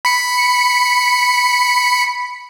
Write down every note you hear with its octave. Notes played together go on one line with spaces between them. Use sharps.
B5 C#7